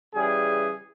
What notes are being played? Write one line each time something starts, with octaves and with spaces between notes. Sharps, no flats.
C#3 E3 G3 G#4